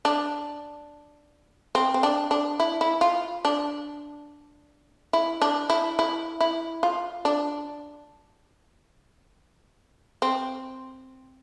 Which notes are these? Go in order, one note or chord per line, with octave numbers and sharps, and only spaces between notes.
D4
C4
C4
D4
D4
E4
E4
F4
D4
E4
D4
E4
E4
E4
F4
D4
C4